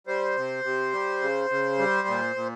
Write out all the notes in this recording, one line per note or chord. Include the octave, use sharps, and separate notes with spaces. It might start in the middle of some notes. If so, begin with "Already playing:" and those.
G3 C5
C3
C3
G3
C#3
C#3
G3
A#2
A#2